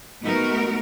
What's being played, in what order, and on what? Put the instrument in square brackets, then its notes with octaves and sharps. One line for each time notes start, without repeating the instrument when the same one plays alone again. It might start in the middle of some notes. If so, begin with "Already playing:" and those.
[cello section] G#3 A3 B3 D#4 F#4 A#4